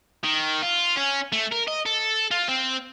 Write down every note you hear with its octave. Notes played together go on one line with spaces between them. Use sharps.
D#3
F4
C#4
A3
A#4
D#5
A4
F4
C4